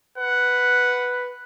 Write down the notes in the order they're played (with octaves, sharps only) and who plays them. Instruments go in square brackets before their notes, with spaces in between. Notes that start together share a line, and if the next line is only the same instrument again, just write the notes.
[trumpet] B4 [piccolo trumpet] F#5